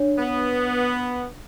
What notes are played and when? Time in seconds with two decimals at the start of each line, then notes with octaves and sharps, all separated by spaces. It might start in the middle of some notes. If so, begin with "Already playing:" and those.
Already playing: D4 C#5
0.19 B3